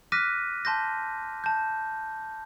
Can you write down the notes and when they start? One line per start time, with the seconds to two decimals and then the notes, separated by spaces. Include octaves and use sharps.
0.12 D6 F6 F#6 A#6 B6 D#7
0.65 A5 C6 G6 A#6
1.44 A5 G6